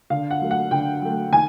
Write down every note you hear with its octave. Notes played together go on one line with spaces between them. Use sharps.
D3 F5
F#5
F#3 A3
F#5
D3 G5
F#3 A3
D#3 G#5